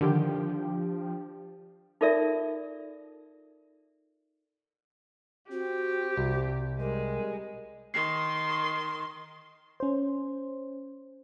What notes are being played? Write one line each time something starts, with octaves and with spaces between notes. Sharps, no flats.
D3 D#3 F3 D4 G4 G5
D#4 F4 A4 A#4 D5 E5
C4 F#4 G4
C2
G3 G#3 A#4
D#3 C6 C7
C#4 C5